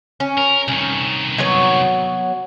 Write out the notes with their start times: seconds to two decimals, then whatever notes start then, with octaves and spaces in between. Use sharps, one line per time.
0.20 C#4
0.38 A#4
0.68 C2 D#3 C#4
1.38 F#3 B3 C#5